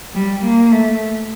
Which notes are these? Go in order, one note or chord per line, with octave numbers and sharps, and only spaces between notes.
G3
A#3
A3